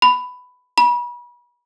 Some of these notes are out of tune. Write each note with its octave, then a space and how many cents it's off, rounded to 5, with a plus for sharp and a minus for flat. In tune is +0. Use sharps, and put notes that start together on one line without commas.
B5 +10
B5 -35